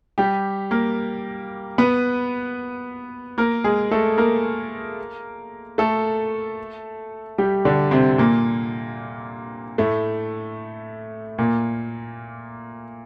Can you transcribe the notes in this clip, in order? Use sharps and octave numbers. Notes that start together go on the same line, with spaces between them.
G3 G4
A#3 A#4
B3 B4
A#3 A#4
G#3 G#4
A3 A4
A#3 A#4
A3 A4
G3 G4
D3 D4
C3 C4
A#2 A#3
A2 A3
A#2 A#3